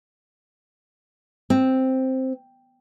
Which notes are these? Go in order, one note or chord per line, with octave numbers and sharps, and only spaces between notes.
C4